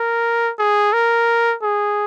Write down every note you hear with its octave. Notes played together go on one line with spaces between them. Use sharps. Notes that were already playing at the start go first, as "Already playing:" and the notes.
Already playing: A#4
G#4
A#4
G#4